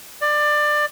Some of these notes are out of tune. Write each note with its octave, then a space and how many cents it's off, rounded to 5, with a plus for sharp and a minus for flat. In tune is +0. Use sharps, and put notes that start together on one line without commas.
D5 +20